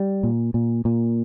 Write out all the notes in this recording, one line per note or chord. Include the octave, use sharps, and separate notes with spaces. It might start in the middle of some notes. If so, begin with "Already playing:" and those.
Already playing: G3
A#2
A#2
A#2